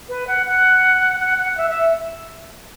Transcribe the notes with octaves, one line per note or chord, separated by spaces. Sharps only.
B4
F#5
F#5
F#5
F#5
E5
E5